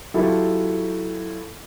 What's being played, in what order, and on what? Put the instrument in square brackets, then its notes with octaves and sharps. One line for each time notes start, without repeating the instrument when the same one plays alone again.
[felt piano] F#3 E4 F4 G4 A4